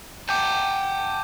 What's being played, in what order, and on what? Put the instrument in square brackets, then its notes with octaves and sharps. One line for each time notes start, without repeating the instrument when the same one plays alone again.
[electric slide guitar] F#5 G5 A5 [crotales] D6 G6